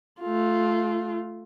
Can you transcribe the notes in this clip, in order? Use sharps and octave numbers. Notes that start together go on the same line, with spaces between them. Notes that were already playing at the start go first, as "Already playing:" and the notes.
A3 F4